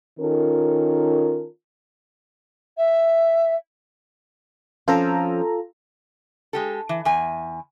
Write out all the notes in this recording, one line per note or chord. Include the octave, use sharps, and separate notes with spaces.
D#3 C#4 F4 A4 A#4
E5
F3 C4 C#4 F4 A4 A#5
G#3 G4 A4
E3
E2 G#5